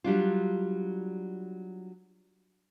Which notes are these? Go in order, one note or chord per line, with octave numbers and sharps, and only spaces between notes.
F#3 G3 D4 F4